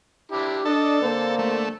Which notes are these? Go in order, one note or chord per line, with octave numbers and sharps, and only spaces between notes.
D4 E4 G4
D4 A4 D#5
D3 A#3 C4
A3